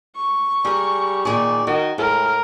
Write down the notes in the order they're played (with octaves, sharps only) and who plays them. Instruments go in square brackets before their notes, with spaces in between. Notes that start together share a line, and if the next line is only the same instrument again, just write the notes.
[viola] C#6
[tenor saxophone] G3 [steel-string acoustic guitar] G#4 A#4
[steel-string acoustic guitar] A#2 D#3 G#4 [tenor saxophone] D5
[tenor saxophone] D#3 [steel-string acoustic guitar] F#4
[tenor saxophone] A2 [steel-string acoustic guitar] G#3 [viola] A#4